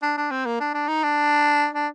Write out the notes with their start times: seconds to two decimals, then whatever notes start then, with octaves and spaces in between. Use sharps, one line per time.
0.02 D4
0.17 D4
0.31 C4
0.45 A#3
0.60 D4
0.74 D4
0.88 D#4
1.03 D4
1.74 D4